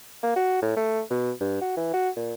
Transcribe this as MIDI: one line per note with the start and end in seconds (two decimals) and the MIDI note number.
0.23 0.36 58
0.36 0.61 66
0.62 0.74 45
0.76 1.01 57
1.10 1.31 47
1.41 1.58 43
1.62 1.76 66
1.77 1.90 52
1.93 2.10 66
2.16 2.34 46